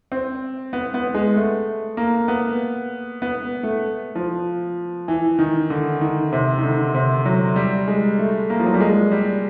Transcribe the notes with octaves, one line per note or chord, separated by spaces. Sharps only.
C4
B3
B3
G#3
A3
A#3
B3
B3
A3
F3
E3
D#3
D3
D#3
C3
D#3
D3
C3
F#3
G3
G#3
A3
A#3
F3
F#3
G3
G#3
G3